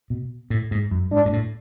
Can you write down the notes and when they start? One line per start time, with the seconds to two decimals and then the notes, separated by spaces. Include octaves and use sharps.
0.10 B2
0.50 A2
0.71 G#2
0.91 F#2
1.12 G#2 D4
1.25 G#2
1.33 A2